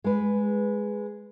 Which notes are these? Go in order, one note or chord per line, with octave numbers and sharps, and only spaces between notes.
G#3 B4